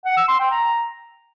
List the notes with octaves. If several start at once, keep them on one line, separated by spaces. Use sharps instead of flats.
F#5
E6
C6
G5
A#5